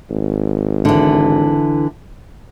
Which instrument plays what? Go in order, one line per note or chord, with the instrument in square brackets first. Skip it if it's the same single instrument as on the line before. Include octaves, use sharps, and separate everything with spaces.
[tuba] G#1
[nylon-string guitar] D3 E3